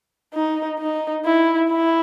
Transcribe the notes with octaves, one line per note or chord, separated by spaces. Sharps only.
D#4
D#4
E4
E4